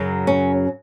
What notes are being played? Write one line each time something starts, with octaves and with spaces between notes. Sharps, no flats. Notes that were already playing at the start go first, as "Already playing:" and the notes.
Already playing: F#2 C#3 F#3
C#4